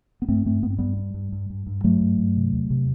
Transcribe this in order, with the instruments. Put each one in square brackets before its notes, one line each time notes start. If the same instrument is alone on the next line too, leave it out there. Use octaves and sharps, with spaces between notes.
[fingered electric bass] B3
G2 A3 C4
G2 A3 C4
G2 B3
C4
G2 G3 B3
G2
G2
G2
G2
G2
G2 F#3 A3
G2
G2
C3
E2
C3